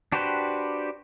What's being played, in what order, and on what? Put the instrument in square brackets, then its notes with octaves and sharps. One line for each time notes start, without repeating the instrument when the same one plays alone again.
[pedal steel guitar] D4 F#4 G4 B4 C5